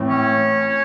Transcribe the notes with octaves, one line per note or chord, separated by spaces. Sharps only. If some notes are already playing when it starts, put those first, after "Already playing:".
Already playing: A2 E3 A3 C4
C#4 C#5